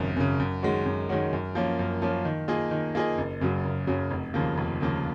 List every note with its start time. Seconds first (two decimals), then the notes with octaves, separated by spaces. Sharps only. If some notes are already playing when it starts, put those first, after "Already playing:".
Already playing: G#1 F#2 C#3
0.16 F#2 C#3
0.39 F#2
0.63 D#3 G#3 C#4 F#4
0.86 F#2
1.09 D#3 G#3 C#4 F#4
1.33 F#2
1.55 F3 A#3 C#4
1.79 F#2
2.02 F3 A#3 C#4
2.25 D#3
2.48 A#3 F4 G#4 D#5
2.71 D#3
2.95 A#3 F4 G#4 D#5
3.18 F#1
3.41 F#2 C#3 F#3
3.65 F#1
3.87 F#2 C#3 F#3
4.11 F1
4.34 D#2 C#3 F3 A#3
4.58 F1
4.81 D#2 C#3 F3 A#3